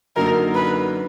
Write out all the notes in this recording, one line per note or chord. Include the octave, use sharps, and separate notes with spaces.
F#2 D3 F#3 A#3 D#4 A#4
B4